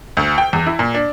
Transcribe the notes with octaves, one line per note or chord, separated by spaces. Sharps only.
D2
G5
E2
E4
A#2
D4